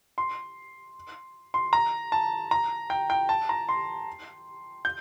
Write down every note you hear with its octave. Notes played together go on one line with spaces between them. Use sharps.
C6
C6
A#5
A5
A#5
G5
G5
A5
A#5
C6
G6